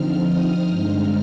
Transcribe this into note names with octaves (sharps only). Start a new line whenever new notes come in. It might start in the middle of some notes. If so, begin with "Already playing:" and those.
Already playing: D3 F3 C4 D#4 F6
D#6
G2 D3 G#3 C4 D#4 F6